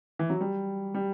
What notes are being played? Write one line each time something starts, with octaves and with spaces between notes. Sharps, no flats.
E3
F#3
G3
G3